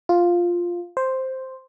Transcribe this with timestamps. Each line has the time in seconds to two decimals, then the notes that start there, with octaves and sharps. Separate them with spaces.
0.09 F4
0.97 C5